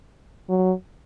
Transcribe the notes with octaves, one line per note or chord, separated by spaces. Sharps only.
F#3